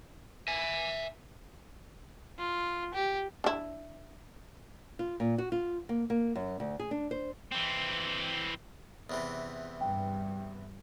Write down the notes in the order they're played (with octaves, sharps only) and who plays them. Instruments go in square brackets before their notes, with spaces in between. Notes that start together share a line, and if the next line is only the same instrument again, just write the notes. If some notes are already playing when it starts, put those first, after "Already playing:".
[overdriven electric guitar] E5 G#5
[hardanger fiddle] F4
G4
[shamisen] D4 E4
[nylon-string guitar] F4
A#2
F#4
F4
A#3
A#3
F#2
D2
G#4
D4
C5
[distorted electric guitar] E3 C4
[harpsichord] E2 C3 E3
[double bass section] G2 [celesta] G5